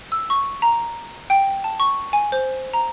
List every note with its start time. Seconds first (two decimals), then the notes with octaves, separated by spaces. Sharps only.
0.12 E6
0.30 C#6
0.62 A#5
1.30 G5
1.64 A5
1.80 C#6
2.13 G#5
2.32 C5
2.73 A#5